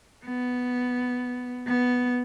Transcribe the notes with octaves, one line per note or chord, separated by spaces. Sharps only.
B3
B3